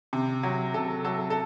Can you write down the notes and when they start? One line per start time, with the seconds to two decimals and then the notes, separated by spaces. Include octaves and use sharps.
0.13 C3
0.43 F#3
0.74 C3 A4
1.05 F#3 A4
1.30 A4